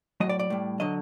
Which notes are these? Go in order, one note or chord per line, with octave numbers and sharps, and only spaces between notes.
A2 F#3 D#5
D5
D5
A2 G3
D3 F#3 D#5